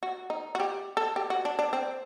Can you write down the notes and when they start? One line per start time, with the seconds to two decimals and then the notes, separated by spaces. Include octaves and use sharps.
0.03 F#4
0.30 D#4
0.55 F#4
0.60 G4
0.97 A4
1.16 G4
1.30 F#4
1.45 D4
1.59 D4
1.73 C4